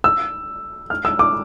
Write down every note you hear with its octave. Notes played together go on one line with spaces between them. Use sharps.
E6
F6
E6
D6